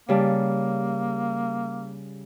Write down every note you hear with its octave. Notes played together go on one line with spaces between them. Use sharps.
C#3 G3 A#3 A5